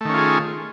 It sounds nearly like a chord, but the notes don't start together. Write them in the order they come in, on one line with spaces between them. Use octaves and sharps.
A3 D#3 C#4 F4 G#4